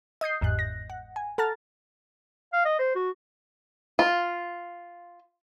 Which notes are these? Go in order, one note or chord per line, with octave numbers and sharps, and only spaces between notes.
D#5 D#6 G6 C7
G1 E2 G#2 F#6
A#6
F#5
G#5
A4 F#5 A5 A#5 F6 A6
F5
D#5
C5
F#4
F4